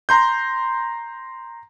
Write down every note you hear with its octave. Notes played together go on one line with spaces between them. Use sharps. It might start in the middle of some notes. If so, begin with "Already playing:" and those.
A#5 C6 G6